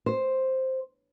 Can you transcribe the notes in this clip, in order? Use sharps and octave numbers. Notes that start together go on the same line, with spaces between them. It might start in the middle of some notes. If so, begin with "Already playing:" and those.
C5